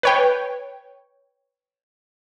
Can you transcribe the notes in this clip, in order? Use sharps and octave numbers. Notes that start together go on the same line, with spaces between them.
B4 C#5 G5